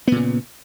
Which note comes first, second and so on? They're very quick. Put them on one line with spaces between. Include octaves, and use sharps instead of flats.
B3 A#2 C#3